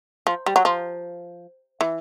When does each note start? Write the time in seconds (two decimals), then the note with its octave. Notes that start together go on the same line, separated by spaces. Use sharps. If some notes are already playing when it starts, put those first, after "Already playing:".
0.27 F3
0.46 G3
0.56 F#3
0.65 F3
1.81 E3